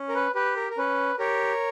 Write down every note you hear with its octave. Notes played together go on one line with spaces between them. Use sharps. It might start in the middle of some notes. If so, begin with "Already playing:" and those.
Already playing: C#4
A#4
B4
G4 B4
A#4
A#4
C#4 B4
G4 A#4 C#5